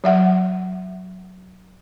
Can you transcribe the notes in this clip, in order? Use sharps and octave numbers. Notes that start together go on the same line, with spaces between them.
F#3 E5 F#5